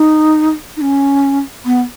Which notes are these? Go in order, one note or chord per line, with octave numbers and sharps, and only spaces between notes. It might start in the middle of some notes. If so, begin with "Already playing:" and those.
Already playing: D#4
D#4
C#4
B3